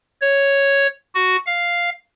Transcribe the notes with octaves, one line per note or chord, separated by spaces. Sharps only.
C#5
F#4
F5